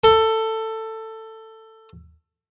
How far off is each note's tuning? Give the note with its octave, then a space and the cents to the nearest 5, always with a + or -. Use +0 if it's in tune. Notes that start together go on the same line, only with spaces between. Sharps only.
A4 +15